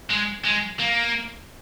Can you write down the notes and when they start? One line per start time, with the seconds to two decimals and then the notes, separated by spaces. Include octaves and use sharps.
0.10 G#3
0.45 G#3
0.80 A#3